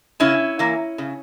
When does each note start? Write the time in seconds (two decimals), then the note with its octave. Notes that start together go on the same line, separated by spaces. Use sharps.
0.20 C#3 C#4 E4
0.59 E3 A#3
0.98 C#3